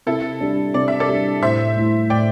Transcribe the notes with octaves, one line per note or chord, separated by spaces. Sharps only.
C3 E4 A4
G3 D4
C3 D5
E5
A4 D5
G3 D4
A2 C5 E5
A3 E4
A2 D5 G5